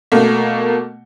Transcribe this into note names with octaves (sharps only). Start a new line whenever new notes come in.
B2 A3 A#3